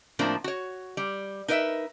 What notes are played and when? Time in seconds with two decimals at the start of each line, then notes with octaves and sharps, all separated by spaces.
0.19 A2 F3 A#3 C4 D4 A#5
0.44 F#4 C#5
0.97 G3
1.48 D#4 A#4 B4 D#5 E5